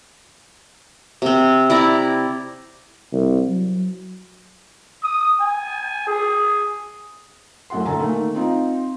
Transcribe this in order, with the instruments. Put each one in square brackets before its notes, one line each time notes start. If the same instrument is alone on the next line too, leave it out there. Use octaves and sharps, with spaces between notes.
[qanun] C3 C4
E4 D5 A#5
[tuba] C2
F#3
[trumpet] D#6
G#5
G#4
[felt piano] F1 F#2 A2 F#5 C6
F#1 D2 A4 G#5 A#5
D#3 A3 A#3
C4 D#4 F4